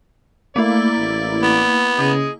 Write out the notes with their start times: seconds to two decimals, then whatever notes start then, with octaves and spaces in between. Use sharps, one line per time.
0.56 A3 A#3 E4 D5
0.98 A1
1.42 B3
1.99 C#3 G#4 D#5